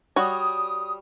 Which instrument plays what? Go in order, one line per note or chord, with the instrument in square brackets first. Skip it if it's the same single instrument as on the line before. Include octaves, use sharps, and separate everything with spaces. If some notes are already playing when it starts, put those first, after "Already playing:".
[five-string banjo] G3 F#4 C#5 [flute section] D#6